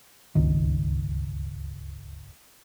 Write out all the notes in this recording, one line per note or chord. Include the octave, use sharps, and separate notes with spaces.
D1 G1 C#2 D#3